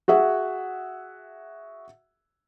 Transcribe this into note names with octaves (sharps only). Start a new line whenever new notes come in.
F#4 G#4 E5 F#5